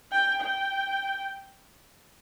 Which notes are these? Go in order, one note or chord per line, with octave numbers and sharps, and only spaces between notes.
G5
G5